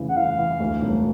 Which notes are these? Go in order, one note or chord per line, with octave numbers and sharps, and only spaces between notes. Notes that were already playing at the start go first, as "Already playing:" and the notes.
Already playing: F1 C#3 E3
F#5
E3 F5
E3
D2
E1